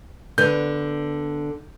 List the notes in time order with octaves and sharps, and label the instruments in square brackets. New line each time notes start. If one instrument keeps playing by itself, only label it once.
[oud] D3 B3 [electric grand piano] G6